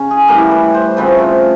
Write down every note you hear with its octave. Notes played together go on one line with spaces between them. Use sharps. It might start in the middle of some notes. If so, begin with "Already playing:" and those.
Already playing: C#3 C#4
G#4
A2 E3 G3 A#3 A#4
B4
C5
C#3 F3 A3 C4 B4
F4